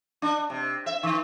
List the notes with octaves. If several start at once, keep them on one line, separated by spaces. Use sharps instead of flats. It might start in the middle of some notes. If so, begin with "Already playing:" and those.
D4
C3
E5
D#3